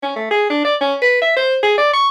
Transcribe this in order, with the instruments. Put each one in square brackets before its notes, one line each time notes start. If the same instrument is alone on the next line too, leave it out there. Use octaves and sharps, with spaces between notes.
[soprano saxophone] C#4
A3
G#4
D4
D5
C#4
B4
E5
C5
G#4
D5
C#6